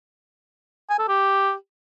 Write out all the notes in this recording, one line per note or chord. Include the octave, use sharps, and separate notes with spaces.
G#5
A4
G4